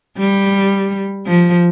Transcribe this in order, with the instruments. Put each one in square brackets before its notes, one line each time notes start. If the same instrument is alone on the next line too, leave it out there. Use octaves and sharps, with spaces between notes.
[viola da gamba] G3
F3